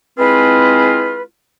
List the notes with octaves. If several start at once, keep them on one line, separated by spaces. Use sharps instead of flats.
G#3 C4 E4 F4 G#4 B4